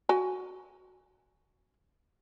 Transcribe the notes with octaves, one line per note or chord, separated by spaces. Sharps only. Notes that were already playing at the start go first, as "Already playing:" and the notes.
F#4 G#5